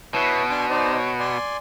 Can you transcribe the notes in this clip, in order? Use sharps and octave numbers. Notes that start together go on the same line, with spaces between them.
B2 E4 B4 C#5
D4 G#5 C6
D#4 C5 D5
C#5
D5 G#5 C6